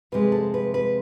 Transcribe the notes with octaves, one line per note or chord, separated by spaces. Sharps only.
F2 C3 G#3 B4
A4
B4
B4